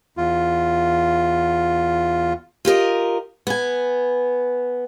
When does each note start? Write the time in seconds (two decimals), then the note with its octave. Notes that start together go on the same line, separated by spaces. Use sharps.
0.17 E2 F4
2.65 F4 G4 A#4 D#5
3.47 B3 G#5